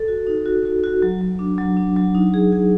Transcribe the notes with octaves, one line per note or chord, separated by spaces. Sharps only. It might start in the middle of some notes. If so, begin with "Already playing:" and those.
Already playing: A4
F#4
D#4
F#4
F#4
F#4
F#3
F#3
D4
F#3
D4
F#3
D#4
G#4
G#4